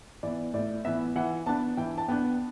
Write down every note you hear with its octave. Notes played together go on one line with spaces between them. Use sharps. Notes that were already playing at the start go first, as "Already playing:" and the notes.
E3 B3 D5
A2 D5
E3 B3 E5
E3 F#5
B3 D4 A5
E3 G5
A5
B3 D4 G5